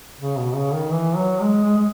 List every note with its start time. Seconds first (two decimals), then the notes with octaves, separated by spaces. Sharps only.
0.20 C#3
0.38 B2
0.55 C#3
0.74 D#3
0.92 E3
1.16 F#3
1.40 G#3
1.64 G#3
1.77 G#3